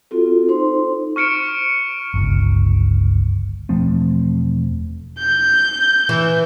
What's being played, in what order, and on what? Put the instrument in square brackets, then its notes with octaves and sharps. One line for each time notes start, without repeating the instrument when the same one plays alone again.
[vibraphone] C4 F4 F#4 A4
D#4 C5 C6
[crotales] C#6 F6 C#7 D7 E7
[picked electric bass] G1 C#2
E1 F3 A3 C4
[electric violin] G6
[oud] E3